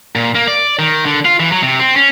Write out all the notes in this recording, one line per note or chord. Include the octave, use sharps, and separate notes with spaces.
A#2
A#3
D5
D#3
D3
F4
E3
F#3
C3
C4
C#4